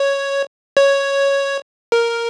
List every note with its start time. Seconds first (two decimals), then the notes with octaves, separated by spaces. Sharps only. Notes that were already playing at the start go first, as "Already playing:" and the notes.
Already playing: C#5
0.77 C#5
1.92 A#4